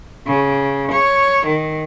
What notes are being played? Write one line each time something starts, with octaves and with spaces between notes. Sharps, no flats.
C#3
C#5
D#3